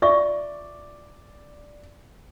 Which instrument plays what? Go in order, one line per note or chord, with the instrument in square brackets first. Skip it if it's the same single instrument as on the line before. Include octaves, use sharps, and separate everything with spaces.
[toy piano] F4 E5 C#6 [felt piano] D5